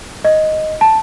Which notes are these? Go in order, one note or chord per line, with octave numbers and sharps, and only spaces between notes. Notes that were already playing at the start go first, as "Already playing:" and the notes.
D#5
A5